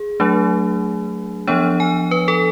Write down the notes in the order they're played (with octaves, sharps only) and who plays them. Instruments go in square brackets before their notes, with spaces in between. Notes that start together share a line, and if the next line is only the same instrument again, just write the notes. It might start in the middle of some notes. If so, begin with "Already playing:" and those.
Already playing: [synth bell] G#4
F#3 A3 D4
F3 B3 D4 C#5
G#5
B4
A4